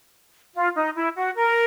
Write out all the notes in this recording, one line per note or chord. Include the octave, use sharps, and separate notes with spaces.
F4
D#4
E4
F#4
A#4